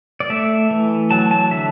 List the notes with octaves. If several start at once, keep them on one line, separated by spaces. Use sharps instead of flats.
D5
A3 E5
E3
F#3 A5
A5
D3 E5